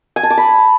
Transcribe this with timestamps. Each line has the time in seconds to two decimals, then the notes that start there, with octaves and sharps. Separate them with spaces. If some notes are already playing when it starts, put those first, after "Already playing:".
0.16 G#5
0.23 A5
0.30 D6
0.38 B5